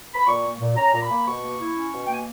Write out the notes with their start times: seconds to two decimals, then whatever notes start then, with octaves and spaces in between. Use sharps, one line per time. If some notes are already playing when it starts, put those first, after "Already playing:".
0.15 B5
0.26 A#2 C#6
0.43 A#3
0.60 A#2
0.76 C#4 A#5
0.93 A#2
1.01 B5
1.10 A#3
1.26 B2 C#6
1.43 A#3
1.59 E4
1.76 C#4
1.92 B2
2.06 G5
2.09 A#3 G#5